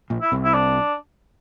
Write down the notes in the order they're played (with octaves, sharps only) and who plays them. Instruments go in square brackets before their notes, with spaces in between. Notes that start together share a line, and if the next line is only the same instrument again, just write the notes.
[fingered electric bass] A#1 A#2
[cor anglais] E4
[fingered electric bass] C2 C3
[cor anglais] E4
D4